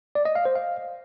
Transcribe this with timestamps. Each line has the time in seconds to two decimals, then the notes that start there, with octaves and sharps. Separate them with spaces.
0.15 D5
0.25 D#5
0.35 F5
0.45 C5
0.55 F5